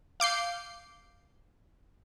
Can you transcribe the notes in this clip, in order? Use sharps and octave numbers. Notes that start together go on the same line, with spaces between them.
F5 D6 G6 C7